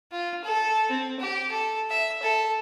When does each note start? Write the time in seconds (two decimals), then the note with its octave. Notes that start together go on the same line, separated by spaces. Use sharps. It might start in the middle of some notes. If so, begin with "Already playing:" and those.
0.12 F4
0.44 A4
0.90 C4
1.20 G4
1.51 A4
1.90 E5
2.22 A4